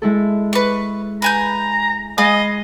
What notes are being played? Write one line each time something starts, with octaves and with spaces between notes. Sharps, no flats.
G#3 E4 A4
B4 C#6
B4 G#5 A#5 G6
G#3 G#4 D#5 F5 B5